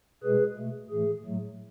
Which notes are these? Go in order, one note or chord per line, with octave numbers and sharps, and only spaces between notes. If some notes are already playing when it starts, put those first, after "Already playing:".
B2 G#3 G#4 B4
B2 A3
A2 E3 A3 G#4
A2 F#3 A3